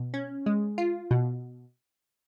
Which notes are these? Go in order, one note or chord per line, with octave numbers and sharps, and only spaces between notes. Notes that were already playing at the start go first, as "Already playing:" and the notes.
Already playing: B2
C#4
G#3
F4
B2